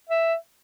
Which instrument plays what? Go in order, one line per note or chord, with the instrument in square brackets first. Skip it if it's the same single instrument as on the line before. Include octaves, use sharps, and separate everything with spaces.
[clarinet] E5